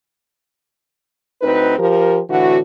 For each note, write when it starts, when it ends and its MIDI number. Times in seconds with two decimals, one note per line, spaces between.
1.42 1.74 38
1.42 1.74 60
1.42 1.74 63
1.42 1.74 71
1.77 2.19 53
1.77 2.19 67
1.77 2.19 70
2.29 2.58 45
2.29 2.58 50
2.29 2.58 52
2.29 2.58 66